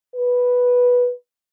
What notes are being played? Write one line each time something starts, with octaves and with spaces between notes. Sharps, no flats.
B4